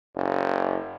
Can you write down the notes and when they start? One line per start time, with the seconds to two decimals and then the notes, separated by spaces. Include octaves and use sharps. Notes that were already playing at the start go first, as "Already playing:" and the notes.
0.16 F#1